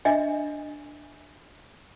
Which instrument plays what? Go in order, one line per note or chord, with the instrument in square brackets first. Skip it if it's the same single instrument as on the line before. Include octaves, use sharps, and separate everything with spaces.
[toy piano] D4 D#5 E5 G#5